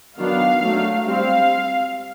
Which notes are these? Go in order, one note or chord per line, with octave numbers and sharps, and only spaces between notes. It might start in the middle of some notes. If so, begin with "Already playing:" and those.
D#3 F#3 B3 D4 F5
F#3 A3 D4
G3 C4 F5